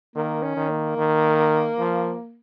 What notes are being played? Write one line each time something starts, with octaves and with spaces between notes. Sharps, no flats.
D#3 A#3
C#4
D#3
A#3
D#3
F3